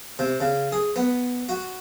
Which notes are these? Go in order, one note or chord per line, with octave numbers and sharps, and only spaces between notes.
C3
C#3
G#4
B3
F#4